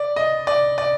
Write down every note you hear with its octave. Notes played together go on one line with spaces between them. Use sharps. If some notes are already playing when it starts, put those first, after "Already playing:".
Already playing: D5
D#5
D5
D5